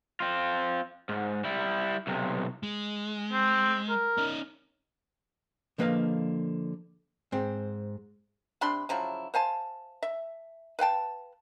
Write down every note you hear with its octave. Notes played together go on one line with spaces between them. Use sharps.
C4 F4
G#2
G3 E4
B1 C3
G#3
C4
A#4
C#4 D#4
D3 F3 A#3 B4 D#5 F5
G#2 C4
C3 D4 B5 C6
C#3 F3 F#3 E4
C5 F5 G#5 A5
E5
B4 F5 G5 A5